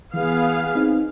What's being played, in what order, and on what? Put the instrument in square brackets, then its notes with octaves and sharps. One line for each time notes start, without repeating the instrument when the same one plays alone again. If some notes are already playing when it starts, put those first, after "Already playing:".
[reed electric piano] E3 [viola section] B3 G#4 F5
[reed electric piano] C4 D#4